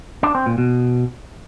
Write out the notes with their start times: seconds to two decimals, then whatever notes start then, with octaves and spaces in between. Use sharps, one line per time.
0.23 D4
0.35 C4
0.46 A#2
0.58 B2